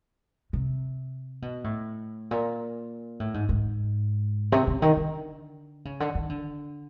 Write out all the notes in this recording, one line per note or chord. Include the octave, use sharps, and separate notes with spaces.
C3
B2
A2
A#2
A2
G#2
G#2
C3
C#3
D#3
D3
C#3
D3
D#3
D3